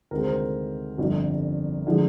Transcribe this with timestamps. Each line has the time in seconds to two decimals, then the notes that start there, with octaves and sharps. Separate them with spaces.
0.11 D2 C3 D#3 G#3 A#4
0.20 C5
0.28 A#4
0.98 G1 F2 D3 G3
1.87 D3 F3 G#3